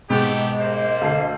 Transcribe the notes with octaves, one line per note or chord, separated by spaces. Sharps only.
G#2 B2 A3 B3 G4 D#5
G3 A#3 C5
D2 A4 F5 C7